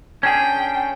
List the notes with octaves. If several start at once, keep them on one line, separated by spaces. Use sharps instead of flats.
C#4 D4 G#4 G5